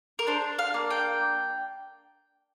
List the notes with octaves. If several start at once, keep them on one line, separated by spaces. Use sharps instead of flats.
A#4
D4 C5
F5
A#3
G5